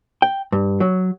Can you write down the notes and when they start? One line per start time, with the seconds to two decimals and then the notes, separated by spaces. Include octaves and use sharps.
0.22 G5
0.52 G2
0.80 F#3